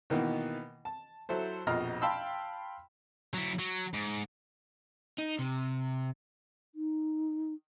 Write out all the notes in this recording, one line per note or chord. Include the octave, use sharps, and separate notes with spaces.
B2 D#3 E3 A#3 B3
A5
F#3 E4 A4 C5
A#1 F2 B2 D#5 A#5 F6
F5 G5 A5 B5 C6 E6
F#3 E4
F#3
G#2
D#4
C3
D#4